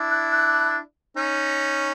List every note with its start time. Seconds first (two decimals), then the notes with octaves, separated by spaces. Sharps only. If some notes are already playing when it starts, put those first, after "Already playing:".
Already playing: D4 E4
0.10 F#6
0.32 F#6
1.16 C#4 D#4